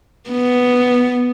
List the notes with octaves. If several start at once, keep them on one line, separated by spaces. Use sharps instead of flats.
B3